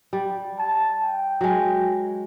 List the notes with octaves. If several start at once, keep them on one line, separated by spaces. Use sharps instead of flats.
G3
A5
G5
F#3 G#3